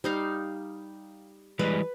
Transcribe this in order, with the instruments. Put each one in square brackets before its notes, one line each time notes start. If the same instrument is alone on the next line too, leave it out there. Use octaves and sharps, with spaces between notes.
[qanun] G3 D#4 F5
[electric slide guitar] E3 G3 G#3 [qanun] B4